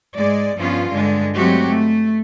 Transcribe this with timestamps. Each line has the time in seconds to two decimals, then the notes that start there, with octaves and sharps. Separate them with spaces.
0.15 G#2 G#3 D5
0.56 G2 F3 B3 C#4 F4
0.90 G2 D3 G#3 D4
1.36 F#3 G#3 A3 C4 F#4 G4
1.68 A3